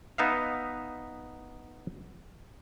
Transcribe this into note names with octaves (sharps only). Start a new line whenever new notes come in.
B3 D#4 E5 F5